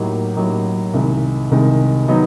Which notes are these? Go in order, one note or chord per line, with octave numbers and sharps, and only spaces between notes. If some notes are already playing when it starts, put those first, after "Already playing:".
Already playing: A2 F#3 A#3 D#4 G4
A2 F#3 A#3 D#4 G4
C2 C3 D#3 G#3
C2 C3 D#3 G#3
D#3 F#3 B3 D#4